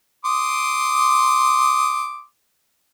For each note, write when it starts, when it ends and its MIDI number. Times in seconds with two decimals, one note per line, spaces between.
0.25 2.24 84
0.25 2.24 86
0.25 2.24 87